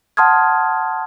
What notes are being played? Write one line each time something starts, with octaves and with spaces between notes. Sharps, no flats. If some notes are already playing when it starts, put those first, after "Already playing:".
F#5 A5 C6 D#6 F6 G#6